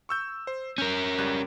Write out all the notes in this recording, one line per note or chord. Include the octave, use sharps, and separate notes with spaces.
C#6 E6 G6
C5
C#4 A#4 G6
C#2 G3 F#6